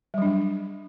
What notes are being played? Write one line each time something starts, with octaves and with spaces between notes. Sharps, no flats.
F#3 G3 D4